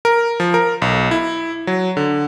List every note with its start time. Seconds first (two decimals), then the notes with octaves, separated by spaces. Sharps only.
0.05 A#4
0.40 F3
0.54 A#4
0.82 B1
1.11 E4
1.67 F#3
1.97 D3